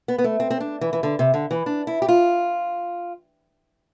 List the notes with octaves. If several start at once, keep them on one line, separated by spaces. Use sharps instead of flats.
B3
B3
A3
C4
C4
D4
E3
E3
D3
C3
D3
E3
D4
E4
G4
F4